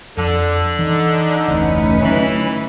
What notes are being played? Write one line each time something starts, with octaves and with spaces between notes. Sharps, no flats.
F2 D3 F3 A4
E3 C4 D4 D#4
F1 D2 E3 A3 C#4 B4
D3 E3 F#3